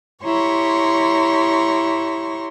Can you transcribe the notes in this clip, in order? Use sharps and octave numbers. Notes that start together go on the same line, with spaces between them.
E4 G4 C#5 A#5 C6 C#6